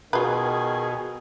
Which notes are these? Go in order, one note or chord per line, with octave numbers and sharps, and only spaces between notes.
B2 D#3 F4 G#4 B4